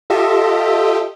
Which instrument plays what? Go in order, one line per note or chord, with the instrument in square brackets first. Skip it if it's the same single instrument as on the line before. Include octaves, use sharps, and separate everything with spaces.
[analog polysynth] F4 G4 A4 D#5 E5